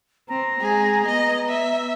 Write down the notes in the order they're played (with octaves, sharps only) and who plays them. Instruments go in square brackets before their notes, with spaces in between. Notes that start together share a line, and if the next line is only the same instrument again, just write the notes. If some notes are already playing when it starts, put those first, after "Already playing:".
[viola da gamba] C4 [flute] A#5
[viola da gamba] G#3 [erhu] G#4
[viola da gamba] B3 [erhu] D#5
[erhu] E5